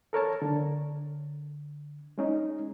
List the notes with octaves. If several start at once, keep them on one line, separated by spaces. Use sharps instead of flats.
A4 A#4 C#5 A5
D3
G#3 C#4 D#4